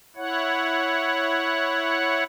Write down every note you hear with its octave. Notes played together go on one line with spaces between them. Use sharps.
E4 C#5 F#5